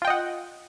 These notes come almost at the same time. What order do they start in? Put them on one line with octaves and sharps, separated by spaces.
F4 G5 D#5 F#5